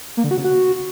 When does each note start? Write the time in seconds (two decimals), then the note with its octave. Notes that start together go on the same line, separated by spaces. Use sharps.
0.17 A#3
0.24 D3
0.31 F#4
0.38 C#3
0.45 F#4